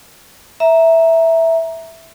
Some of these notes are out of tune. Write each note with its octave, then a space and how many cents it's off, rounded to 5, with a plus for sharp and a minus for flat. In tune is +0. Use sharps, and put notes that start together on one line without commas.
E5 -5 A#5 +0